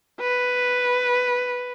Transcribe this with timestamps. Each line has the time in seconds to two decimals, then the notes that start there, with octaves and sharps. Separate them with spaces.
0.21 B4